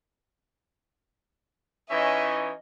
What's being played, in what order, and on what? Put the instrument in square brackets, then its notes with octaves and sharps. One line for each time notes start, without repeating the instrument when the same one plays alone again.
[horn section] E3 C#4 D#4 [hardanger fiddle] D#5 [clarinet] E5